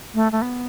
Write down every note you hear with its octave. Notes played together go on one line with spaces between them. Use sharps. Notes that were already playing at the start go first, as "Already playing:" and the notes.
A3
A3
B3